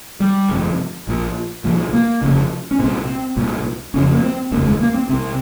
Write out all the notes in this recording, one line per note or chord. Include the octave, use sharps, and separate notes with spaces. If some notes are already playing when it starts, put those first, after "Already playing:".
G3
G1 F2 C3
A#1 A#2
C2 A#2 F3
A#3
F1 D#2 C#3
C#4
C2 A#2 C4
C2 A#2
F1 F2 C#3 C#4
A#3
C4
F1 D#2 C#3 A#3
G#3
A#3
C4
C2 C3 C4